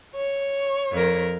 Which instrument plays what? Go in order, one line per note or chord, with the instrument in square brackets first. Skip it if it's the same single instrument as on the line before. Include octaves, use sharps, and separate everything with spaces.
[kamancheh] C#5
[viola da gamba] F2 A#4